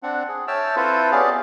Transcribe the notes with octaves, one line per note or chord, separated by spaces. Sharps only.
C4 D4 F#5
G#4
C#5 E5 G5 A5 E6 F6
C4 E4 F4 A4 B4 C5
B3 C#4 G4 G#4 D5 F5